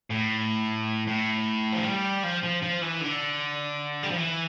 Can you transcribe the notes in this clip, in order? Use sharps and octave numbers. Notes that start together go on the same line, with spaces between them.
A2
A2
F3
G3
F3
F3
F3
E3
D3
G3
F3
E3